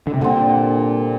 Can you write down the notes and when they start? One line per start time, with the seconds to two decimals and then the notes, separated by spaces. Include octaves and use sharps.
0.07 D3
0.14 C3
0.21 A#2 D3 G3 C4